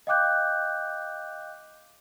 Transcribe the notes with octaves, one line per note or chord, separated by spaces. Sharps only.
D#5 F5 G5 D6 F#6 G6